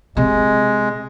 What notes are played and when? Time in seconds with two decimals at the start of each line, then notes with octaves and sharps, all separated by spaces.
0.17 C3 G#3 C4